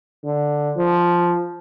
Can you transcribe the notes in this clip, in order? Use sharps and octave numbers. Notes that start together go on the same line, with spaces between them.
D3
F3